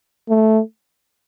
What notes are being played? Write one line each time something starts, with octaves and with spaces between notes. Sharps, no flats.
A3